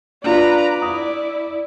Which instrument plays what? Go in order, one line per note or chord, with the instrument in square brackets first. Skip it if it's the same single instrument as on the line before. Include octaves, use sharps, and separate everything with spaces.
[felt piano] D4 F4 [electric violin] B4 A#5 [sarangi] D5
[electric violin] E4 [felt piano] D#6